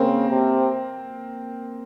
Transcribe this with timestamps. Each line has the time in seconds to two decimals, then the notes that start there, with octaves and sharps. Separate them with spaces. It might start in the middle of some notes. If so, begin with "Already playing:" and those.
Already playing: C#3 A#3 C4
0.30 C3